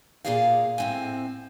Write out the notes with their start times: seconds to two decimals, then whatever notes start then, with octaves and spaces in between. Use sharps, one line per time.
0.25 A#2 E3 A#3 G#4 D5 F5
0.78 A2 C4 G#5